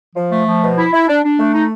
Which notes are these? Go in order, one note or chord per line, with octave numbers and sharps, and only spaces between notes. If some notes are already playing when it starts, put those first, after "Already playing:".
F3
A3
F3
B2
E4
E4
D4
D4
A3
D#4